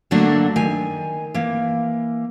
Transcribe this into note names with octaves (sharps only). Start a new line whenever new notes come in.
D3 F#3 A3 A#3 D4
D#3 G#5
E3 A#3